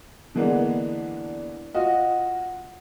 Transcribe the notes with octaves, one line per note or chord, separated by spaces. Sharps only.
D3 E3 G#3 A#3 B3 D4
F4 F#4 D#5